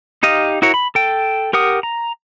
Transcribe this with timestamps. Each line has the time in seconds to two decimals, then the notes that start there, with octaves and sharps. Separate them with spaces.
0.23 D#4 G4 D#5 F5
0.62 E4 F#4 A#4 C#5
0.74 B5
0.95 A4 G5
1.53 G4 A#4 F#5 D#6
1.83 A#5